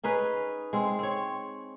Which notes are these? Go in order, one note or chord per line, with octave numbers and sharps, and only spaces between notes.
C#4 D#4 G#4 B4
G#3 C4
C4 C#5